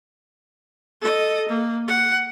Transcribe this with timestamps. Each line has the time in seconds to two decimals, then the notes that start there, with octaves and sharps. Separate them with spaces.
1.01 A4 D#5
1.49 A#3
1.88 F#5